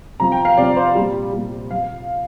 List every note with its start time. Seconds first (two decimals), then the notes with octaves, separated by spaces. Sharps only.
0.20 C3 F3 A#5
0.32 G5
0.45 F5
0.57 C3 F3 D5
0.77 C5
0.95 A#2 G3
1.33 A#2 G3
1.71 F3 F5